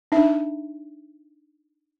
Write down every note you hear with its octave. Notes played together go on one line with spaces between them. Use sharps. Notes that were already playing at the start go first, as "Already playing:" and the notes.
D4 D#4 E5